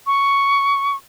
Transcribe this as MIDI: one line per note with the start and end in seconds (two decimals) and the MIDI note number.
0.07 0.96 85